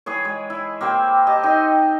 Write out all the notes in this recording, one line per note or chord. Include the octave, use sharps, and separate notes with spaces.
E3 G#4 B4 C#5
G#3
E4
A#3 C4 G4 C5
G4 D#5 A5
C4 D#4 C6